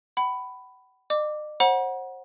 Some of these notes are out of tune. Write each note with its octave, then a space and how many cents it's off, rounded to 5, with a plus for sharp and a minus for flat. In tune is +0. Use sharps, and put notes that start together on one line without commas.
F#5 +40 B5 +10
D#5 -45 D6 +0
C5 +35 F#5 +0 A#5 +45